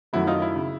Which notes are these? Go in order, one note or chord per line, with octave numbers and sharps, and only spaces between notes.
F#2 D#3 F#3 A3 E4 F#4
D#4 F4
E4
C#3